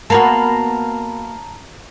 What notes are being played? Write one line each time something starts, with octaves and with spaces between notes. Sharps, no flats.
A#3 B3 F#4 A5 A#5